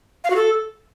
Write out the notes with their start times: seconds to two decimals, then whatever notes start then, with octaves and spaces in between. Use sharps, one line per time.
0.24 F5
0.30 F#4
0.36 A4